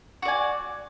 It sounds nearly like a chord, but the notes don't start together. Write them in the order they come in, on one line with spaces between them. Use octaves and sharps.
F#4 D5 G#5